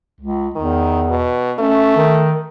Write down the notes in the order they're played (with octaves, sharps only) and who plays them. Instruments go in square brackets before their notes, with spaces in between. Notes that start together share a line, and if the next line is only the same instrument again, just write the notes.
[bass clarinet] C#2
[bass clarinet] E2 [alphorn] D#3
[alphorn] B2
[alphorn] A3 [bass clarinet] C#4
[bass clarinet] D#3